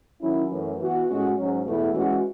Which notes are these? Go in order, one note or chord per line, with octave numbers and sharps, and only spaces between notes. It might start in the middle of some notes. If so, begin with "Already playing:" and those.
D#3 F#3 C#4 E4
F#2 E3 A3 C#4
E3 B3 F#4
A2 G#3 C#4 F#4
G#2 F#3 C#4
E2 B2 A3 E4
E3 G#3 C#4 F#4